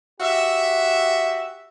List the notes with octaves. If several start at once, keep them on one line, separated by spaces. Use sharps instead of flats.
F#4 G4 E5